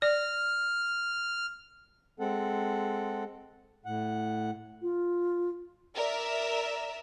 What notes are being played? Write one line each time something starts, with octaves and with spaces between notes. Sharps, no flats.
D5 F6
G#3 C4 A4 F#5
A2 F#5
F4
A#4 D5 E5